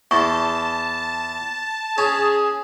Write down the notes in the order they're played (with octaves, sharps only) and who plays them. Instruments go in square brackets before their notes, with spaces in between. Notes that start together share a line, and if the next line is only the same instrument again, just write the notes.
[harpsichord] E2 [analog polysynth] A5 [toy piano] C#6
[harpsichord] C#4 [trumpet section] G#4